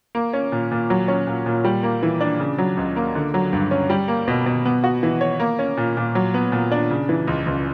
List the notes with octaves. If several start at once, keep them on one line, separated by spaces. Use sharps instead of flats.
A#3
C#4
A#2
A#2
F#3
C#4
A#2
A#2
G3
A#3
E3
D4
C#3
F#3
C#2
A#3
D3
F#3
G2
C#4
G3
A#3
B2
B2
B3
F#4
E3
C#5
A#3
C#4
A#2
A#2
F#3
B3
A#2
D4
C#3
E3
C#2
C#2